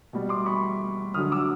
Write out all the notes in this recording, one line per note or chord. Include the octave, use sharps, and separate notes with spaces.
B2 G3
C6 D6
B5 C#6
D3 F#3 D#6 F6
D6 E6